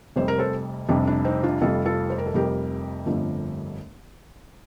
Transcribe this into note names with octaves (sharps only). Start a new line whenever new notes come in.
F1 F2 C3 G3 C5
A#4
A4 C5
F1 F2 C3 G3 D4
D4
C4 D#4
D4 F4
F1 F2 C3 G3 F4 A4
F4 A4
C5
A#4
A4
F1 F2 C3 G3 G4 A#4
G1 F2 D3 F3 A3